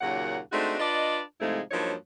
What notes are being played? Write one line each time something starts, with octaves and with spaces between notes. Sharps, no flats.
D#2 A#2 C#3 F#3 F#5
G#3 A3 C4 D4 D#4 F#4
D4 F4 B4 D5 D#5
G#2 C3 F3 G#3 A3 E4
G2 F3 F#3 A#3 D#4 C#5